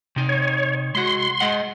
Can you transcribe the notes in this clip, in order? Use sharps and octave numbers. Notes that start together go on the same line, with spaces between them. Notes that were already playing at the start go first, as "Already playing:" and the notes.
C3 D#4
C#5
G#3 F#4 C6
G#3 D#5 F#5